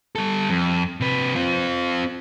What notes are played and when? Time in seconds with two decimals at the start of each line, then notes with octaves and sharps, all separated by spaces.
0.15 G3 A4
0.50 F2
1.00 C3 B4
1.36 C4 F4